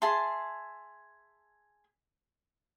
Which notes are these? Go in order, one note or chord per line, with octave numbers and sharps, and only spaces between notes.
G#4 E5 A5 C6